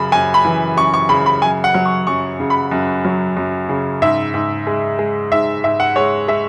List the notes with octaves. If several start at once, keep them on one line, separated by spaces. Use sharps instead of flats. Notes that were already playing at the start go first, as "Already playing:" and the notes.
Already playing: F#2 C#3 B5
F#2 G#5
B5
E3
F#2 C#6
C#6
C#3 B5
B5
F#2 G#5
F#5
F#3
C#6
F#2 C#6
C#3
B5
F#2
F#3
F#2
C#3
G#2 E5
G#2
G#3
G#3
G#2 E5
G#2 E5
F#5
G#3 C#5
G#3 E5